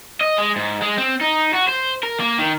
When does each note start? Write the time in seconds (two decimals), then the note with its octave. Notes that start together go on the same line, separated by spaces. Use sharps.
0.21 D#5
0.38 G#3
0.56 G#2
0.82 G#3
0.98 C4
1.21 D#4
1.55 F#4
1.68 C5
2.03 A#4
2.20 A#3
2.39 D#3